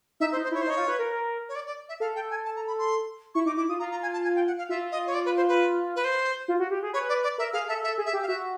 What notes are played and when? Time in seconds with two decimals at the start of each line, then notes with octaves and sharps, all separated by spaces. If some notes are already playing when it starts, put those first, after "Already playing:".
0.20 D#4 E5
0.32 C5
0.36 D#4
0.44 C5
0.51 E4 C#5
0.62 C5
0.66 D#4
0.70 C#5
0.77 F4
0.88 B4
0.99 A#4
1.49 C#5
1.55 D5
1.67 D5
1.89 E5
2.00 A4 F5
2.16 G5
2.31 G#5
2.45 A5
2.56 A#5
2.67 B5
2.79 C6
3.35 E4 C#6
3.46 D#4 D6
3.57 E4 D6
3.69 F4 D#6
3.79 F4 A#5
3.91 A#5
4.03 G#5
4.13 A5
4.24 G#5
4.36 G5
4.47 F#5
4.58 F5
4.69 F4 E5
4.92 D#5
5.07 C#5
5.14 D5
5.26 B4
5.37 C5
5.48 B4
5.96 B4
6.04 C5
6.48 F4
6.59 F#4
6.71 G4
6.83 G#4
6.93 B4 C#5
7.09 D5
7.24 D5
7.38 A#4 E5
7.53 G#4 F5
7.68 A4 E5
7.83 A4 E5
7.98 G#4
8.06 E5
8.13 G4
8.22 F5
8.28 F#4 E5